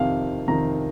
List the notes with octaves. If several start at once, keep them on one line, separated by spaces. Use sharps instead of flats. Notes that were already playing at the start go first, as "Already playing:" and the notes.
Already playing: F2 C3 D#3 F5
F2 C3 D#3 A#5